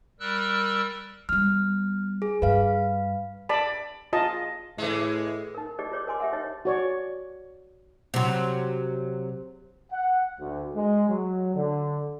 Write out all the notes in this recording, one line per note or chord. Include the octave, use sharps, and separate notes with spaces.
G3 A#4 E6 F#6
G3 B3 F6
G#4
G2 B4 F5
D5 A5 B5
F4 D#5 A5
A2 E3 G#3
D#4 A#4
D#4 G4 G#4 D5 D#5
F4 C#5 D5 D6
A#4 D#5 G#5 C6 D6
G4 E5 F#5
D#4 C#5 D#5
F#4 C#5 D5
C3 F#3
F#5
D2
G#3
F#3
D3